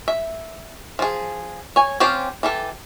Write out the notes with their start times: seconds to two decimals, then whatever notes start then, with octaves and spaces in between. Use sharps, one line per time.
0.08 E5
0.99 F3 G#4
1.76 C#5 G#5
2.00 C4 C#4 F4 G4 C5
2.43 E3 G4 A4